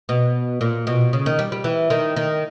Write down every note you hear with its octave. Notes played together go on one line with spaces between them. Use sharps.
B2
A#2
B2
C#3
D#3
G3
G3
E3
D#3
D#3